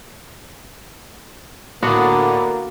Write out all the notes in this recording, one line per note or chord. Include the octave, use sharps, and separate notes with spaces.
A2 D3 A#3 B3 D4 F#4